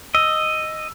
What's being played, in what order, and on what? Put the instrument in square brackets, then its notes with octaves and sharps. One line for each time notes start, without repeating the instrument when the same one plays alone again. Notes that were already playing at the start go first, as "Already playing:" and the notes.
[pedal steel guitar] D#5 [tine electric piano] E6